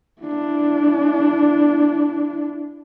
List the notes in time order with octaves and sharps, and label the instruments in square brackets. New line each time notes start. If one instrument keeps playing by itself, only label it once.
[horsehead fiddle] D4 E4